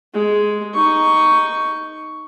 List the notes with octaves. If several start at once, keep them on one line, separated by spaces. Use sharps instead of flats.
G#3
D#4 C#6